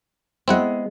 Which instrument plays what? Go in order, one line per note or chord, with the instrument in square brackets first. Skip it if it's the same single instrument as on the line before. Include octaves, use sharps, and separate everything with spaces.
[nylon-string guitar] G#3 B3 [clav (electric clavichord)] C4 E4 F#5